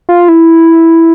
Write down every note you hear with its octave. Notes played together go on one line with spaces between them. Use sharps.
F4
E4